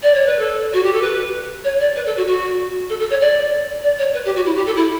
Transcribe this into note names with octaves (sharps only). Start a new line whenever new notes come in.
D5
C#5
B4
A4
F#4
G4
A4
B4
C#5
D5
B4
A4
F#4
F#4
A4
A4
C#5
D5
D5
C#5
B4
G4
F#4
E4
G4
A4
E4